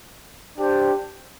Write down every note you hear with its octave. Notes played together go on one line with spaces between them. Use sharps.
D4 G4 C5 G5